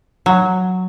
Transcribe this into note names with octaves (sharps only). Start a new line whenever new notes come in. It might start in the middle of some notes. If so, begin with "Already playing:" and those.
F#3